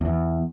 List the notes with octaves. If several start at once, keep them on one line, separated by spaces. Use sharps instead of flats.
E2